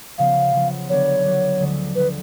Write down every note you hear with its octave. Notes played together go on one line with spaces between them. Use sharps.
C#3 F3 B3 F5
C#3 F3 B3
D3 F#3 B3 D4 C#5
D3 F#3 B3 D4
D2 D3 F3 G#3
D2 D3 F3 G#3 B4